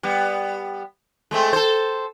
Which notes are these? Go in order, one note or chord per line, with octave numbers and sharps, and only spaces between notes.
G3 B3
G#3 A3 C4
A4 C5